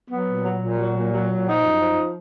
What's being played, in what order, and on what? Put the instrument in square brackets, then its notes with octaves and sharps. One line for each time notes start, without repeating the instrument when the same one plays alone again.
[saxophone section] F#3 B3
A#2
F#3
A#2
F#3
A#2
F#3
A#2
F3 D#4
F#2
F3